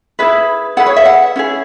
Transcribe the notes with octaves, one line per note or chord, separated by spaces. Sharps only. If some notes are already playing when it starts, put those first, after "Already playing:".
E4 G#4 B4 E5
E4 G#4 B4 F#5
C#5
E5
F#5
C#4 E4 G#4